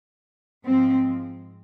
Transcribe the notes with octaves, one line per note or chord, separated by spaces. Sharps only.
G#2 F3 G#3 C4